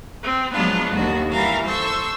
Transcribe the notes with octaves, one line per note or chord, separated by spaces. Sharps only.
C4
F3 F#3 G#3 B3 D4 F4
D#2 D3 D#3 F#4
E3 G3 F#4 A#4 F5
A4 C5 C#6 E6